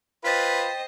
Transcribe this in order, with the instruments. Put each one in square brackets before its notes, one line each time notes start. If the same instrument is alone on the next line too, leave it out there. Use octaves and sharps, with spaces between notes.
[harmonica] F4 B4 [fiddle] C5 D#5 [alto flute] G5 [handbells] A6 B6